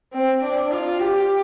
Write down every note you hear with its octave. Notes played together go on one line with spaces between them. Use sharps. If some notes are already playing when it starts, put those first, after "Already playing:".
C4
D4
F4
G4